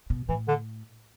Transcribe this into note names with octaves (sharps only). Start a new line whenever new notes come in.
B2
A2 E3
D3